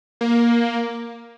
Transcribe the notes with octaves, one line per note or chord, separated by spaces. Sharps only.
A#3